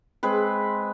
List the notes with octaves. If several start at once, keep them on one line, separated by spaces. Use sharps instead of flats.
G#3 C4 B4